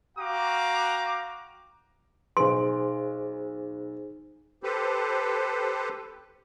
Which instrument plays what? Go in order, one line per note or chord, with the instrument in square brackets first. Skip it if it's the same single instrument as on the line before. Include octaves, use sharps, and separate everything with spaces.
[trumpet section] F#4 F5 G5 A#5 D6
[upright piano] B1 D7 [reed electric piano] G#4 C5 [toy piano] C6
[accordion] G4 A4 B4 C5